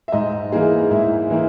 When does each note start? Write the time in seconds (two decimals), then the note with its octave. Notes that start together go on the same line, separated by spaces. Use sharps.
0.08 E5
0.12 G#2 D#5
0.52 E3 A#3 D#4 G#4
0.91 G#2 E4
1.30 E3 A#3 D#4